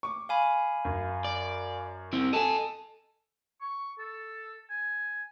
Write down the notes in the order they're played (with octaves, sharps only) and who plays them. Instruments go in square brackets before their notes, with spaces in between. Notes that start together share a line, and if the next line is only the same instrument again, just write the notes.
[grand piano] C#6 D6
[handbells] F5 G#5 B5
[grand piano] F#2
[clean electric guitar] D5
C4 E4
[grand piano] A4 G#5 [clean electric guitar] D#5 A5
[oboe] C#6
A4
G#5